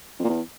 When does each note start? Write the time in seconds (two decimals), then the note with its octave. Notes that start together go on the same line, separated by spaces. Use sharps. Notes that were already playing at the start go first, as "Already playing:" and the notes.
0.19 F2
0.24 A#2
0.29 E2